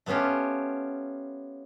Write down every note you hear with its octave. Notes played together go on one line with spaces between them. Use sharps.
A3 B3 C#4 F4 G4